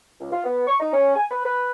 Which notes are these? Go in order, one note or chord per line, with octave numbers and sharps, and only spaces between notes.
C#2
F4
B3
C#6
D#4
C#4
G#5
B4
B4